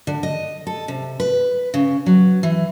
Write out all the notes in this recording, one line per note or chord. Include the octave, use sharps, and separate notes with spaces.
D3
D#5
A4
C3
B4
C#3
F#3
E3